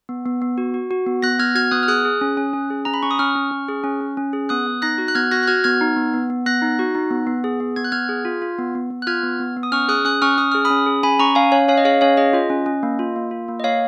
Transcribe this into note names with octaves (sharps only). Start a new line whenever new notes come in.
B3
B3
B3
F#4
F#4
F#4
B3
B3 F#6 A#6
B3 F6 G#6
F#4 F6 G#6
B3 D#6 F#6
F6
G#4 D#6 F#6
G#4
C#4
C#4
C#4
G#4
C#4 A#5
B5
C#4 C#6
D#6
C#4 C#6 F6
C#4
C#4
G#4
C#4
C#4
C#4
G#4
B3 D#6 F#6
B3
D#4 F#6 A#6
F#4
F#6
B3 F6 G#6
F#4 F#6 A#6
F#6
F#4 F6 G#6
B3 F6 G#6
D#4
B3
B3
B3
B3 F#6 A#6
D#4
F#4
D#4
B3
B3
G#4
B3
B3 G#6
F#6
B3 F6 G#6
G#4
F4
F4
B3
B3
B3
F#6
F4 F6 G#6
B3
B3
B3
D#6
C#4 C#6 F6
G#4 D#6 F#6
C#4 D#6 F#6
C#4 C#6 F6
C#4 D#6
G#4 F6
B5 D#6
C#4
G#4
C#4 G#5 B5
C#4 A#5 C#6
C#4 F5 G#5
C#4 C#5 F5
C#4 C#5 F5
D#5
G#4 C#5 F5
C#4 C#5 F5
G#4 D#5
F4 D#5
C#4
C#4
A#3
F4
A#3
F4
A#3
D#5
A#3 C#5 F5